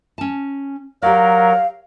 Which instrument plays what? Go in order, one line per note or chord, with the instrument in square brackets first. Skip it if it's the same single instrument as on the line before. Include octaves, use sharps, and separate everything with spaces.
[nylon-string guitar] C#4 A5
[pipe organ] F#3 A#4 [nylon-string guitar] G4 D5 [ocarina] F5